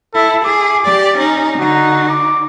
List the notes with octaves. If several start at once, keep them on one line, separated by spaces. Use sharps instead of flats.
E4 A4
G#4 D6
G4 D5
C#4 D#4
D3 D#4 F#4
D6